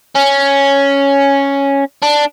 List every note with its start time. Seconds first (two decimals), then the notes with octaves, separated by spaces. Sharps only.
0.16 C#4
2.02 D4